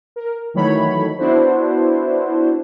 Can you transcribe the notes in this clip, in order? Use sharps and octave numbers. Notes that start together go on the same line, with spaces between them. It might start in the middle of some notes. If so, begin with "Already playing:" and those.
A#4
D#3 E3 F#3 A3 C#5 B5
B3 D4 E4 F#4 C5